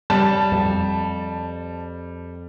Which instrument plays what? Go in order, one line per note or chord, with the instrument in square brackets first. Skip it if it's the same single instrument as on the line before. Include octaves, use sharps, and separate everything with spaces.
[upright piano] G3 [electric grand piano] A5
[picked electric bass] F2